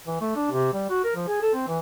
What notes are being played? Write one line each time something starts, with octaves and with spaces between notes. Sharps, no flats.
E3
A3
D4
C3
G3
F#4
A#4
F3
G#4
A4
C4
E3